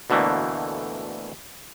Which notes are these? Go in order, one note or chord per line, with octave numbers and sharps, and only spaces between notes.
D2 B2 D3 E3 A3 A#3